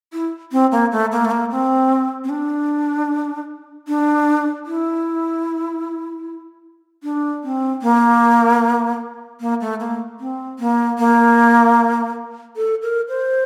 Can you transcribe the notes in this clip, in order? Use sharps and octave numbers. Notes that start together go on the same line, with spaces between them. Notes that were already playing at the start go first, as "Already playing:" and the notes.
E4
C4
A#3
A3
A#3
A3
A#3
C4
C4
D4
D4
E4
D4
C4
A#3
A#3
A3
A#3
C4
A#3
A#3
A4
A#4
C5